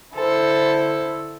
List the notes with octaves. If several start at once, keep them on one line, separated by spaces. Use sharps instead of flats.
D3 E4 A4 C5